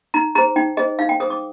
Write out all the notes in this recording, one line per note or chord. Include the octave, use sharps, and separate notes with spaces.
D#4 A#5
G#4 C5 A#5
D#4 G5
G#4 C5 D#5
D#4 F5
G5
G#4 C5 D#6
D6